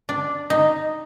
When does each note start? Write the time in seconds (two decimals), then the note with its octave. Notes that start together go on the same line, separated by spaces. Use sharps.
0.09 D4
0.50 D#4